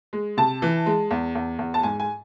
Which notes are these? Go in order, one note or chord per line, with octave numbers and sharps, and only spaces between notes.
G#3
C3 A5
E3
G#3
E2
E2
E2
A5
G#2 G#5
G#5